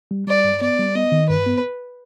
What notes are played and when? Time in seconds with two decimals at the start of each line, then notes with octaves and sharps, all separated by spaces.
0.11 G3
0.27 G3 D5
0.44 G2
0.61 B3 D5
0.79 G3
0.95 B3 D#5
1.12 D#3
1.29 G2 B4
1.46 B3